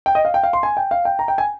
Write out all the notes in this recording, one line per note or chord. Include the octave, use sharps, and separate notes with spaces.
G5
D#5
F5
G5
F5
C6
G#5
G5
F5
G5
A#5
G5
G#5